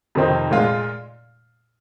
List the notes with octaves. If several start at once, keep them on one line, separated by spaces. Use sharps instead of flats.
F2 C3 D#3 C4 D#4
A#2 G#3 F4